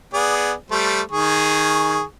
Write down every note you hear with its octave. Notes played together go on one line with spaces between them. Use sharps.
B3 G#4 D5
G3 A3 C5
D#3 G#4 C#6